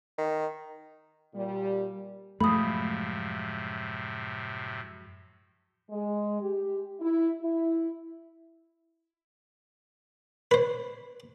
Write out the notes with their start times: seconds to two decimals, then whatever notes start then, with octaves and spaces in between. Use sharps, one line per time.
0.18 D#3
1.34 A#2 G3
2.41 F#2 A2 C3 F3 G#3 A3 B5 D#6
5.90 G#3
6.41 G4
7.00 E4
7.42 E4
10.51 B4 C5